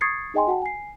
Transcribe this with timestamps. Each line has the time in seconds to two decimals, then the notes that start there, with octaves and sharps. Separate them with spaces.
0.01 C#6 D#6 G#6 A6 C7 C#7
0.34 D#4 G#4 D#5 G5 G#5 C6
0.47 F#4 F#5 G5 A5
0.62 G#5 C7